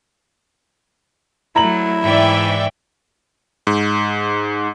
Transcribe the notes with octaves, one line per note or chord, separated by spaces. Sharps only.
F#3 A3 E4 A#5 F#7
G#2 E3 D5 E5 G5
G#2